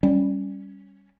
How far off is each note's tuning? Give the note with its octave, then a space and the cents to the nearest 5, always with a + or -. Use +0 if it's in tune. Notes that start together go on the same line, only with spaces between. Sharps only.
G3 +0 C#4 +0